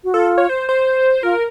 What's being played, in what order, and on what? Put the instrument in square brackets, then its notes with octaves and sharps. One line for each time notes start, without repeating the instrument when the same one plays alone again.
[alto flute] F#4
[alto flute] F4 [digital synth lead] A4
[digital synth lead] C#5
C5
C5
[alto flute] F4 [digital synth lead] A#4